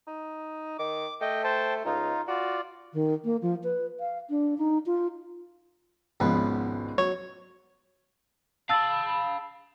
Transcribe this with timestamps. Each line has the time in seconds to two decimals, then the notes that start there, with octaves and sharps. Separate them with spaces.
0.07 D#4
0.79 D#3 D6
1.21 A3 D#5 G5
1.44 C5 G5 A5
1.85 C#2 D#4 F4
2.28 F4 F#4 D5
2.93 D#3
3.24 A#3
3.42 F3
3.64 B4
4.00 F5
4.30 D4
4.58 D#4
4.86 F4
6.20 G#1 C#2 B2 F3 B3 B4
6.98 F#3 C#5
8.69 F5 A5 B5 E6 A6